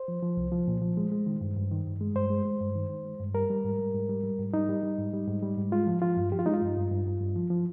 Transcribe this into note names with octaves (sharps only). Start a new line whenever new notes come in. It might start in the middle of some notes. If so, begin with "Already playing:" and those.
Already playing: C5
F3
F3
C2
F3
A#2
F3
G#3
G#3
D#3
G2
G2
D#3
G2
G#3
G2 C5
G#3
G#3
G2
D#3
D#3
G#3
G2
G3 A#4
G3
G#2
G3
G#2
G3
G3
G#2
G3 D#4
G3
G3
G#2
G3
G#2
G3
G#2
G#3 F4
F3
F3 F4
G2
F3 G4
F4
G#3 D#4
F4
G2
G2
G2
G2
G2
F3
F3